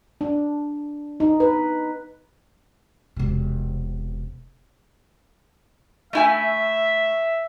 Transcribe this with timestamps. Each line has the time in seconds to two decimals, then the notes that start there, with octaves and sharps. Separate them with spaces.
0.21 D4
1.20 D#4
1.40 B4
3.16 E1 C3
6.13 A3 E4 E5 G#5